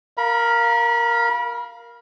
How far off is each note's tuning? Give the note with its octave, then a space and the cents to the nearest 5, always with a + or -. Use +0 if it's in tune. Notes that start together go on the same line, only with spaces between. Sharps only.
A#4 +0 F5 +0 B5 -35